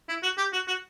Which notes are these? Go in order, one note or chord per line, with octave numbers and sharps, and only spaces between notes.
E4
F#4
G4
F#4
F#4